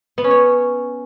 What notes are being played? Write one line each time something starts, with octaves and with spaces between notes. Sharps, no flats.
B3
C#4
C#5